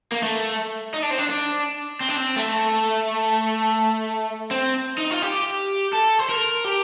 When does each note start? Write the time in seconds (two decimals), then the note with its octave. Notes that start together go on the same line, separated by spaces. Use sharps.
0.12 A#3
0.23 A3
0.94 D#4
1.02 D4
1.11 C4
1.18 D4
1.30 D4
2.01 C4
2.08 D4
2.16 C4
2.36 A3
4.51 C4
4.98 D#4
5.11 F4
5.22 G4
5.93 A4
6.19 C5
6.29 A#4
6.65 G4